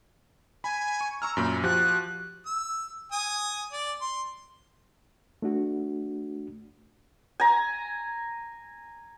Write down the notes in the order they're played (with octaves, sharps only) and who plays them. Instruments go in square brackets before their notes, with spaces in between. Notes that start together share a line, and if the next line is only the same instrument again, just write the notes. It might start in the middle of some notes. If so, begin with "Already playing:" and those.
[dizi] G#5 [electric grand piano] B5
[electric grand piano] C#6
[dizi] A#5 [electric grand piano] C#6 E6 F6
[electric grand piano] F#2 A#2 [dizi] B5
[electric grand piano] F3 F#4 G4 [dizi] F#6
[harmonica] E6
G#5 D#6
D5
C6
[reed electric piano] A3 D4 F#4
[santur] G#5 A#5